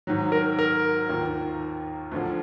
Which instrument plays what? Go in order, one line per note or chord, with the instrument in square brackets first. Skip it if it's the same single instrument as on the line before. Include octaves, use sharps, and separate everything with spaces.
[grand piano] G#2 D#3 F#3
[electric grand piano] A#4
A#4
[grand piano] D#2 D#3 A#3 F4
D2 D3 F3